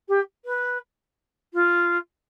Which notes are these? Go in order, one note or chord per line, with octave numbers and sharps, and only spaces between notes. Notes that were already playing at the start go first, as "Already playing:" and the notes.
G4
B4
F4